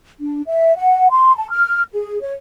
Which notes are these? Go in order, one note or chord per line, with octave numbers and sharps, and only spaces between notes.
D4
E5
F#5
C6
A5
F6
G#4
C#5